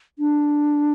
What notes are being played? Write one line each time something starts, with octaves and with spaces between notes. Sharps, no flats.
D4